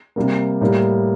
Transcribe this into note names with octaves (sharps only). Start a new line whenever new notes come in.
C3 G3 A#3
A2 G3 A#3